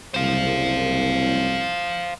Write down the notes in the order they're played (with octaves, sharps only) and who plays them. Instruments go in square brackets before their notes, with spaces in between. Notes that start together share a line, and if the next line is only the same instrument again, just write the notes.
[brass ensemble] F#1 C2 [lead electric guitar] C5 F5